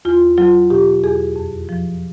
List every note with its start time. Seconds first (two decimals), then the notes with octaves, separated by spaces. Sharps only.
0.05 E2 F4
0.38 F#3 F4
0.70 B2 G4
1.03 E2 G#4
1.36 F2
1.69 F3